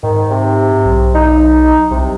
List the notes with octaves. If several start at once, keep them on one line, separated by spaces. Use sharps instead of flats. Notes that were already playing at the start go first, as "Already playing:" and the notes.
G#2 D#3
C3
B1
D#4
C2 C3